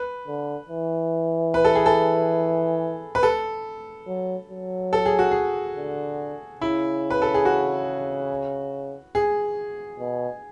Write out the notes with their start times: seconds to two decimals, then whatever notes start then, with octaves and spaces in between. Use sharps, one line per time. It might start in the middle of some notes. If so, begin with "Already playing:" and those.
Already playing: B4
0.27 D3
0.69 E3
1.54 B4
1.65 A4
1.75 G#4
1.86 A4
3.15 B4
3.23 A4
4.07 F#3
4.50 F#3
4.93 A4
5.06 G#4
5.19 F#4
5.31 G#4
5.76 D3
6.61 C#3 E4
7.11 B4
7.22 A4
7.34 G#4
7.45 F#4
9.15 G#4
9.99 B2